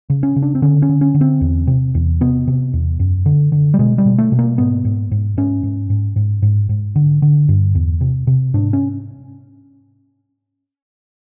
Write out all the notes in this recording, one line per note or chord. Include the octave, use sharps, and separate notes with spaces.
C#3
C#4
C#3
D4
C4
D3 C#4
C#4
D3
C#4
D3
C4
E2
C3
E2
C3 B3
C3
E2
F#2
D3
D3
G3
B2 G#3
G3
B2
A3
B2
A#3
G#2 B3
G#2
G#2
G#2 C#4
G#2
G#2
G#2
G#2
G#2
D3
D3
G2
E2
C3
C3
G#2 D4
C#4